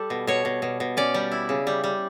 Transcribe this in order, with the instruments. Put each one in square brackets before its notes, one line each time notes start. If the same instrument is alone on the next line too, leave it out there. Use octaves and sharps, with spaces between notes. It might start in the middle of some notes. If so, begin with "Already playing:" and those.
Already playing: [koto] G3 A4
B2
B2 C#5
B2
B2
B2
C#4 D5
G3
E4
C#3
G3
G3